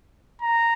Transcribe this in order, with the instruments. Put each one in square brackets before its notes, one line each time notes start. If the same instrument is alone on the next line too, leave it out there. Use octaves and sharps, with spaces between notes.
[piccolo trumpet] A#5